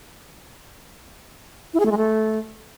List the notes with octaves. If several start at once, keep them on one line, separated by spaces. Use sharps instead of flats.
E4
G#4
A3
G#3
A3